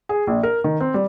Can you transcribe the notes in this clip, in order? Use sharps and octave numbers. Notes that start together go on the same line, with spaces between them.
G#4
A#1
A#4
D#3
C4
G3